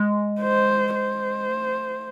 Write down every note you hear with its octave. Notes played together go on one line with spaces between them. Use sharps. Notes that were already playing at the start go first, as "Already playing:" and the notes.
Already playing: G#3
C5
C5
A3